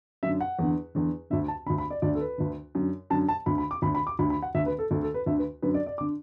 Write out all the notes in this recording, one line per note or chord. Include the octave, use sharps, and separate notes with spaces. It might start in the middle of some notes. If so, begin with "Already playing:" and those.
F#2 D3 E5
F#5
E2 D3
E2 D3
D2 D3 E5
A5
D2 D3 B5
B5
D5
D2 D3 D5
A4
B4
D2 D3
F#2 D3
F#2 D3 A5
A5
D2 D3 B5
B5
D6
D2 D3 B5
B5
D6
D2 D3 B5
B5
F#5
D2 D3 E5
B4
A4
D2 D3 A4
A4
B4
D2 D3 E5
B4
F#2 D3 B4
D5
D5
D6
D3